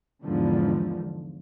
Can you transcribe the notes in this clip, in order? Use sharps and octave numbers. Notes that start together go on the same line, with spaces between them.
E2 G#2 D3 F3